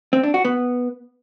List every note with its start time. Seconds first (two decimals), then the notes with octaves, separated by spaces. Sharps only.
0.13 C4
0.23 D4
0.34 F#4
0.45 B3